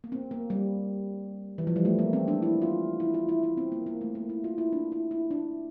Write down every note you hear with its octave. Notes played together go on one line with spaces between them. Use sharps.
A#3
C4
A#3
G3
E3
F3
G3
A3
A#3
C4
D4
E4
F4
E4
F4
E4
E4
C4
A#3
A#3
A3
A#3
E4
F4
E4
D4
E4
E4
D4